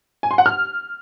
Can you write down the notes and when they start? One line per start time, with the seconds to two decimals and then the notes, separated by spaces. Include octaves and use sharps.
0.23 G#5
0.31 C6
0.38 F#5
0.46 F6